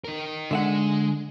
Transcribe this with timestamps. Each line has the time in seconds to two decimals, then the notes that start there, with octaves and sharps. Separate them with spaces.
0.05 D#4 A#4
0.51 D3 G#3 E5 F#5